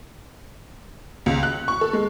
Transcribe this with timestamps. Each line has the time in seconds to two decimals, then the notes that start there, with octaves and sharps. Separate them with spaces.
1.26 C#2
1.43 F#6
1.68 C#6
1.81 A4
1.93 G#3